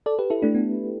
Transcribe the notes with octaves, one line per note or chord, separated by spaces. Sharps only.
A4 D5
G4 B4
E4 A4
A3 D4
B3